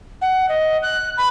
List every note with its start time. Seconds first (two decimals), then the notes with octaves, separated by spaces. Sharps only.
0.22 F#5
0.49 D#5
0.83 F#6
1.18 B5